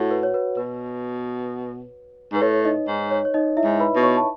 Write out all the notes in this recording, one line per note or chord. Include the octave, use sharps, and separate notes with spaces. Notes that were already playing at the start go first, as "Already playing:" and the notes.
Already playing: A2 F#4 F#5
B4
C#5
B4
B2 B4
G#2 B4
A2 C#5
D#4 D#5
G#2
C#5
C#5
D#4 D#5
E4 E5
G#2
B4 B5
B2
C#5 C#6
A5